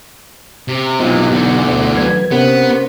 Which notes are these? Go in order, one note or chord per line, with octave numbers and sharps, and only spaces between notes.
C3
B1 C3 E3 F4 F#4 D#5
E2 D3 G#5
D2 B2
F#3 B4 G#6
C3 B3 C#4 A#4 C5